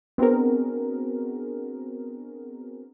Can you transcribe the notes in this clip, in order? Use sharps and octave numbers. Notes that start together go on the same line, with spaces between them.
B3 C4 D4 F#4 G#4 A#4